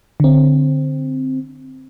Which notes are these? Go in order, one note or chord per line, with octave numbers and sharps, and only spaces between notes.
D3 C4